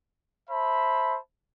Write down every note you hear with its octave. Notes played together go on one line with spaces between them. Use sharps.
C5 E5 A5 B5